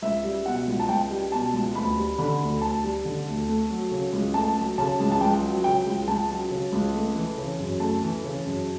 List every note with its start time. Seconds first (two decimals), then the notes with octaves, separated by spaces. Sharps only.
0.02 C#2 E5
0.24 G3
0.46 B2 F#5
0.67 C#2
0.80 A5
0.88 C#2 G5
1.11 G3
1.32 B2 A5
1.53 C#2
1.75 D2 B5
1.97 G3
2.18 D3 B5
2.40 D2
2.61 D2 A5
2.83 G3
3.05 D3
3.27 D2
3.48 A3
3.70 F#3
3.91 C#3
4.13 C#2
4.34 A3 A5
4.57 F#3
4.78 C#3 A5
5.00 C#2
5.12 A5
5.21 C#2 G5
5.42 F#3
5.64 C#3 G5
5.87 C#2
6.08 C#2 A5
6.30 F#3
6.51 C#3
6.72 C#2
6.94 A3
7.16 E3
7.38 C#3
7.59 F#2
7.80 A3 A5
8.02 E3
8.24 C#3
8.45 F#2